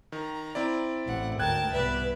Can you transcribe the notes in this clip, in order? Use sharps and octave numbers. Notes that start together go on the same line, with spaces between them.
D#3 A#5
C4 E4 D5
A1 A2 F#5
G#1 D2 A#4 G5 A5 F#6 G#6
C2 B3 B4 D5 E5